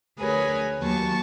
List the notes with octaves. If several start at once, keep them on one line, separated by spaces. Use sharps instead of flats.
D2 G#4 A#4 B4 C#5 G#5
D#2 F#3 A#3 A5 C#6